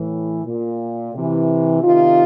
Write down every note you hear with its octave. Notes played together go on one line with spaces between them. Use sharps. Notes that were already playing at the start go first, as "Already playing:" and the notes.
Already playing: A2 E3
A#2
C3 E3
C3 D#3 D#4 F4